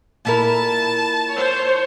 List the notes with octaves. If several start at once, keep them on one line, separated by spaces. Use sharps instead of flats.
A#2 E4 A#4 A5
C5 C#5